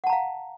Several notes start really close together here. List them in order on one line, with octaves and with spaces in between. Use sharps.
F#5 A5 A#5 F5